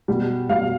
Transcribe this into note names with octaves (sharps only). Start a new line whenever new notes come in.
B2 G3
B2 G3 F5